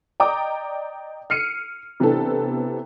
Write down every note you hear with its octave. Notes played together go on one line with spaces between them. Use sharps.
D5 D#5 G5 A#5 D6 D#6
F6 C7 C#7 D#7
C3 E3 B3 D4 A4